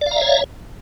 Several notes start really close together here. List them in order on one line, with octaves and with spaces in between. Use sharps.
D5 F5 A#5 E5 C#5